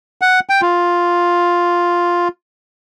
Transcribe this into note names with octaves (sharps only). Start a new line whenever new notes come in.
F#5
G5
F4